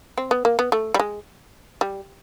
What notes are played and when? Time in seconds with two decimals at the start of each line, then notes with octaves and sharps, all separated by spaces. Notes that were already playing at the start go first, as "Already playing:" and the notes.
0.18 C4
0.31 B3
0.45 A#3
0.59 B3
0.72 A3
0.94 G3
0.99 G#3
1.81 G3